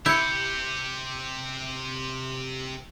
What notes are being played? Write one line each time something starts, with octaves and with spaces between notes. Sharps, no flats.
C3 E4 G4 G6 C#7